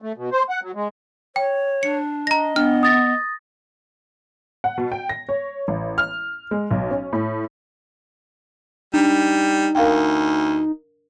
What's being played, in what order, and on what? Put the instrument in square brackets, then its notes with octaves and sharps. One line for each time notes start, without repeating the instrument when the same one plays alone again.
[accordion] A3
B2
C5
F#5
F#3
G#3
[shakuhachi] C#5 [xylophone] G5
[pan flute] D4 [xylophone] C#7
[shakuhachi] D#5 [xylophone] A#5 A#6
[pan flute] B3 [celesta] D4 [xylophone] F6
[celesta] D#6 A6 A#6
[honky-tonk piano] F#5
B2
G5
A#6
C#5
A1
F6
G#3
B1
C#4
A2
[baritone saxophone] G3 [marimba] D4 [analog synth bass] D#4
[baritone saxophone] D2 [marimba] A#4 F5 G5